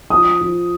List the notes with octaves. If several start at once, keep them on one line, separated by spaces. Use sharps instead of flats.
F3 D#6
F3